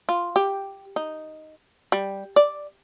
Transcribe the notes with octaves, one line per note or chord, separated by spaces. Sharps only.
F4
G4
D#4
G3
D5